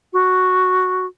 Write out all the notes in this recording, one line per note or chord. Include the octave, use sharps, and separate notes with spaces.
F#4